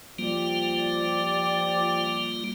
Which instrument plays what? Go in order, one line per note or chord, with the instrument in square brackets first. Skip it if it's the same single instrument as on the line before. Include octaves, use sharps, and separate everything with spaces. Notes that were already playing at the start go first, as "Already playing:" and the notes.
[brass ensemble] F3 G4 D5 [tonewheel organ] G3 A#3 F4